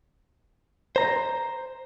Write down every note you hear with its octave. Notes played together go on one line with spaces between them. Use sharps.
C5 A#5